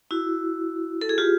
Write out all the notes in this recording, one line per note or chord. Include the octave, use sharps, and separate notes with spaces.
E4 F#4
A4
G#4
F4 G4